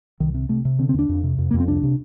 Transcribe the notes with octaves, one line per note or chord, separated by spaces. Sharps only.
C2 D#3
C3
C3 A3
C3
D3 C4
C4
D#2 D4
F2
C3
F2
F2 A#3
C4
C2 D4
C3